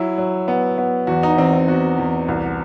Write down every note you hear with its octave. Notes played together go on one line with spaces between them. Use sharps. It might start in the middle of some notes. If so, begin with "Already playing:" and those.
Already playing: F#3 E4
F#3
B3
B3
E2 F#4
D#4
E2 C4
C4
B3 F#4
E2
C2